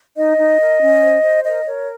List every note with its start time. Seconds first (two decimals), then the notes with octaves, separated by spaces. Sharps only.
0.17 D#4 D#5
0.38 D#4
0.60 A#4
0.81 C#4
1.02 C5
1.23 C5
1.44 A#4 D#5
1.66 A#4 C#5